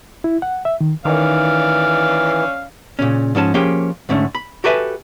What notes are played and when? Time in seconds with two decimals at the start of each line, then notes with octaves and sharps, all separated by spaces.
0.24 E4
0.42 F#5
0.65 E5
0.81 D#3
1.05 D#3 E3 C#4 D5 F5
2.99 A#2 C#3 C#4
3.35 G#2 F3 C#4 A5
3.54 F3 A#3 C#4 G4 G#4 G5
4.09 D2 G#2 D3 A3 C#4
4.35 B5
4.64 F#4 G4 A4 B4 E5 G#5